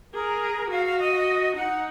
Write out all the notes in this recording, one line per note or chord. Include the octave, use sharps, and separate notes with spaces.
G#4 A#4
F#4 F5
F5
D#5
D#4 F#5